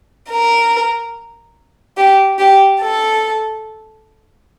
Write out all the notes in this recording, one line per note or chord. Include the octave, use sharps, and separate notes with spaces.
A#4
G4
G4
A4